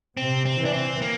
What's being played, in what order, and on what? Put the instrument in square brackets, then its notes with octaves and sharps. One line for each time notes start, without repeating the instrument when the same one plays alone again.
[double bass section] C3 [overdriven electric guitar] C4
[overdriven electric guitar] C4
[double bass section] E3
[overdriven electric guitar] D4
C4
A#3